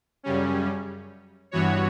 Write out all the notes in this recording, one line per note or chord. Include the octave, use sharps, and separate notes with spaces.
F#2 C#3 G3 C#4
G2 E3 B3 F#4 C#5